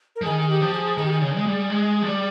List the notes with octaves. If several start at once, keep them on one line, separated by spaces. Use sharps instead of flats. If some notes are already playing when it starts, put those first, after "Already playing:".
A#4
F3
D#3 G#4
G#4
G4
F3
G#4
D#3 G#4
G4
G#4
C#3
G#3
G3
G#3
F3
G3